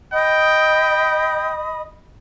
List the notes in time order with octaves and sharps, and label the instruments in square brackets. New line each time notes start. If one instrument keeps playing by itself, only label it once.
[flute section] D#5 B5 D#6 [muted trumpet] G5